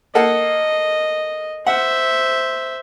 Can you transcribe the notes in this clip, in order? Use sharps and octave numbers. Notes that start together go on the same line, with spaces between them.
A#3 A4 D#5 F#5
C5 E5 F#5